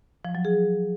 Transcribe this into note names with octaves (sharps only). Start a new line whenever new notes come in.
F3
F#3
G#4